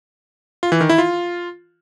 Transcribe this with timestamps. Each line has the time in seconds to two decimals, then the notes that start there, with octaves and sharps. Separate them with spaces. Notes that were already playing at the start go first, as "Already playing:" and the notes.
0.63 F4
0.72 E3
0.81 D#3
0.89 E4
0.98 F4